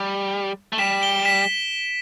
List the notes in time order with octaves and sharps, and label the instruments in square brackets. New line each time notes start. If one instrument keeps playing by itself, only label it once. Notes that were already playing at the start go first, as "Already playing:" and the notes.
Already playing: [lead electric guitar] G3
A3
[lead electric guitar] G3 [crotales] B6 E7
[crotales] D7 G7
B6 E7